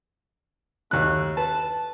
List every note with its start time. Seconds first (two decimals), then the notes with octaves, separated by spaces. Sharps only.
0.91 D#2 A3 F#6
1.37 B4 A5